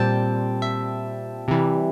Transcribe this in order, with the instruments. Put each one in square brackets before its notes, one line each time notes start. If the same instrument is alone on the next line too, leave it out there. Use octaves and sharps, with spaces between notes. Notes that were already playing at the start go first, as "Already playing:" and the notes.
Already playing: [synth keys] A#2 G3 C4 G5 A5
E5
C3 E3 G3